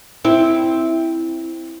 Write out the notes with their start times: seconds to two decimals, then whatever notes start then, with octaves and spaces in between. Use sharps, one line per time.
0.25 C4 E4